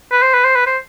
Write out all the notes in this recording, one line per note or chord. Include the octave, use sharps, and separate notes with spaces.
B4
C5
B4
C5
B4
C5